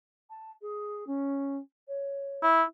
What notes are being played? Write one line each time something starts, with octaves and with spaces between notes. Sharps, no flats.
A5
G#4
C#4
C#5
E4